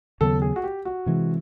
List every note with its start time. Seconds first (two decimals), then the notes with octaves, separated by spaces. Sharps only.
0.20 D#2 C#3 F#3 B3 A4
0.42 G#4
0.56 F#4
0.63 G4
0.85 F#4
1.06 C3 E3 G#3